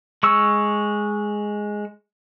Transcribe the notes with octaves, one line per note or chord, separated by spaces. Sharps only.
G#3 C#6 E6